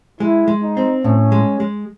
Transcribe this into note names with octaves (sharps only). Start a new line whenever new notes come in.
G#3 E4
G#3
D#4
C4
A2 C#4
G#3
G#3